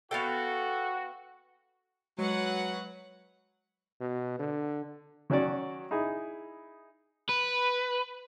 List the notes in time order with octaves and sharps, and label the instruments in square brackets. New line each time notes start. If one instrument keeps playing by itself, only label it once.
[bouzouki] B3 F5 G5 [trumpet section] F#4 [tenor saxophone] A4
[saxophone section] F#3 [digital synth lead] G#3 [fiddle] B4 F#5
[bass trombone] B2
D3
[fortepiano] D#3 F#3 C#4 F#4 D5
D#4 E4 G#4
[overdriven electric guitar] B4